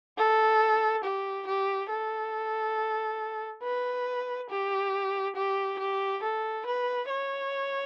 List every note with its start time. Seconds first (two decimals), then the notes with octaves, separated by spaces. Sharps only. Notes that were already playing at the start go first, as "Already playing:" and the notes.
0.17 A4
1.03 G4
1.47 G4
1.89 A4
3.62 B4
4.49 G4
5.35 G4
5.79 G4
6.22 A4
6.66 B4
7.09 C#5